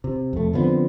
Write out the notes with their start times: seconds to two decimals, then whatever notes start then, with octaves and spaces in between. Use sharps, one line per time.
0.04 C3
0.33 F2 A3
0.53 D3 F3 B3 C4